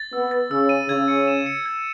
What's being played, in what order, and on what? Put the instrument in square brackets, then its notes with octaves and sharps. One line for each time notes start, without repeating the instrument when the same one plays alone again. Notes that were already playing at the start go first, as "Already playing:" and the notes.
Already playing: [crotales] A6
[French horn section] B3 [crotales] E6
[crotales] A6
[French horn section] C#3 [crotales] E6
[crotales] D#7
[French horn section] C#3 [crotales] G#6
[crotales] C#7
E7
C#7
G#6